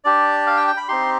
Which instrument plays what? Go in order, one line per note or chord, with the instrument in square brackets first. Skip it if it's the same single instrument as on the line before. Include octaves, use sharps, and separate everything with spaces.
[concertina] D4 G4 D5
F5
G5
G5
B5
C4 D#4 G4 C6